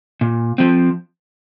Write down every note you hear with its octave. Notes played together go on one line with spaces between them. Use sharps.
A#2
F3 C4